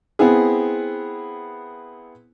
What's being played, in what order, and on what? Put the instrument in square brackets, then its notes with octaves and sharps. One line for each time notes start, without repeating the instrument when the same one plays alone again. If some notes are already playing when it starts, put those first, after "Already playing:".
[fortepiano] B3 C4 E4 G#4